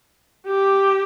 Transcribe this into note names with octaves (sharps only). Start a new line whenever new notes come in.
G4